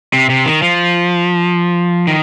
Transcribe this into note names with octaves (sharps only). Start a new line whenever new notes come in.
C3
C3
D#3
F3
D#3